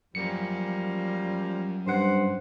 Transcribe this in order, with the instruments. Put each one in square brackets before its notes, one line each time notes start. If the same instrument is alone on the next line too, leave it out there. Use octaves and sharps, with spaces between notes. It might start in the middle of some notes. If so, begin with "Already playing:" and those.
[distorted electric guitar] F#2 [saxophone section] F3 G3 A#3 [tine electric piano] C#7
[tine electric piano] G2 F#5 [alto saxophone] C5